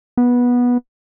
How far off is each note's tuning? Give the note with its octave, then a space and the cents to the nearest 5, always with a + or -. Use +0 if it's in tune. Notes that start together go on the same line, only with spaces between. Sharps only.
B3 -15